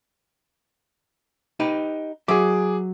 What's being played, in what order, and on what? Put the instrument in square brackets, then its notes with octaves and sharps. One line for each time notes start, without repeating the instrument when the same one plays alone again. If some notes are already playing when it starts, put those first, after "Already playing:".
[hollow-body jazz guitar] D#4 G4 B4
[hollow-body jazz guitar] F#3 E5 [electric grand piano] G#4 D6